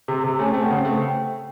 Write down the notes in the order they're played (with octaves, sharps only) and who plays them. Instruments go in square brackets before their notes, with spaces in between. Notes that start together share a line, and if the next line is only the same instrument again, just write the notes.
[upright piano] C3
C3
[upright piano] A3 [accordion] C#4
[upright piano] A3 [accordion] C4
[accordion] B3
[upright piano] C#3 [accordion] C4
[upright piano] A3